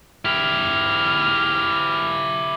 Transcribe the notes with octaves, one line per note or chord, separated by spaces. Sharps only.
E4 G4 F6